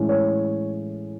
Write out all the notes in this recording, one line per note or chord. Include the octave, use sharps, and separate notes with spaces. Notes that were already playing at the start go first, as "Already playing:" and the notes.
Already playing: A2 E3 G#3 C#4
C#5